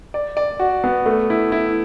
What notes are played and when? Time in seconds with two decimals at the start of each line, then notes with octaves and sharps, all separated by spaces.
0.14 D5
0.37 D5
0.60 F#4
0.84 B3
1.06 A3
1.30 E4
1.52 E4